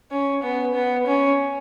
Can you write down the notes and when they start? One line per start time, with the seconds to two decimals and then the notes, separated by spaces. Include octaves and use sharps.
0.11 C#4
0.43 B3
0.74 B3
1.06 C#4